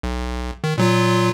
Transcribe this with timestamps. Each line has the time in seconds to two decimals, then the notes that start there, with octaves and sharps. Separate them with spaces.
0.03 B1
0.64 D#3
0.78 A#2 F#3 F4